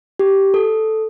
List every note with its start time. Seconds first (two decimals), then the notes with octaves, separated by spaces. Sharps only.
0.19 G4
0.54 A4